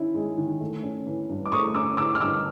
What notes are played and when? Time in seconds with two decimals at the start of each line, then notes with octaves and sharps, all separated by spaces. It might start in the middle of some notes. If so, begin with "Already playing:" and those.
Already playing: D#3 C#4 E4
0.15 G#3
0.37 D#3
0.61 A3
0.83 C#4
1.06 E3
1.29 G2
1.46 D6
1.52 A3 C#6 D#6
1.74 C#4 D6 E6
1.97 E3 D6 E6
2.15 F6
2.20 G2 D6 E6